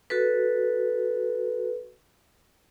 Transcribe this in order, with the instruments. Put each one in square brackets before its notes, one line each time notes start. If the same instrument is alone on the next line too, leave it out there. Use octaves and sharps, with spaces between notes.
[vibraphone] F#4 A4 B4